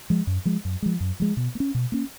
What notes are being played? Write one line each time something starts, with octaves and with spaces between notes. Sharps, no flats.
F3 G#3
F#2
F3 G#3
F#2
F3 G#3
F#2
F3 G#3
B2
A#3
C#4
B2
A#3 C#4